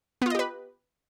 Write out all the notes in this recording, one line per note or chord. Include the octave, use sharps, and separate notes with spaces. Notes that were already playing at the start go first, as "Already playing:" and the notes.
B3 F4 G4 B4 D#5